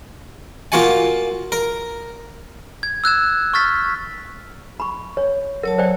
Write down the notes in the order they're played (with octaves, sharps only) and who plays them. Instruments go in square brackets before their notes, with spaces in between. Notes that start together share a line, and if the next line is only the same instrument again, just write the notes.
[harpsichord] A#3 F4 F#4 F#5 G#5
A#4
[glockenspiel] G#6
E6 F#6 G#6 E7
C#6 F6 A6 B6
[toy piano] B5 C#6
C#5
[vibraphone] F#3 C#5 A5 [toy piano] A#4
[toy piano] C5 D5 G5